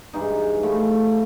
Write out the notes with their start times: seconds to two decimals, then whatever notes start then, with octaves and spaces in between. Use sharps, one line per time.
0.13 G2 E3 G#3 D#4
0.63 A2 F3 A3 E4